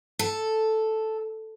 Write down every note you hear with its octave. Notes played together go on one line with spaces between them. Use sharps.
A4